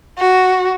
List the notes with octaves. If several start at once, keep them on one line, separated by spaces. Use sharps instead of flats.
F#4